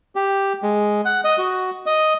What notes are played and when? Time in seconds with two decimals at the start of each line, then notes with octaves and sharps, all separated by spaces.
0.16 G4
0.63 G#3
1.05 F#5
1.24 D#5
1.38 F#4
1.86 D#5